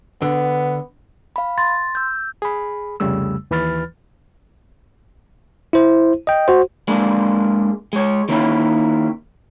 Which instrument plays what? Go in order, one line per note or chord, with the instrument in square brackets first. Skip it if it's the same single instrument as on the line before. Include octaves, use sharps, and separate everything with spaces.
[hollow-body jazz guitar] D3 [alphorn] B3
[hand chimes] F5 B5
[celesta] C6 [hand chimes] A6
[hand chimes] E6 G6
[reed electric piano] G#4 B5
C2 F2 C#3 G3 A3 E6
D#2 E3 B4 B5 F6 A6
[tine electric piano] E4 C5
D#5 G5
F#4 C5
[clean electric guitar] G#3 A#3 D4
G#3 C#5
D#3 A#3 C#4 E4